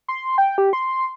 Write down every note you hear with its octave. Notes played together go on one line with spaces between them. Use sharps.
C6
G5
G4
C6